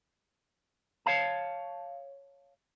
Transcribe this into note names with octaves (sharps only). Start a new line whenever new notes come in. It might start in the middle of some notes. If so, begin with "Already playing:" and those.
C#5 F5 A5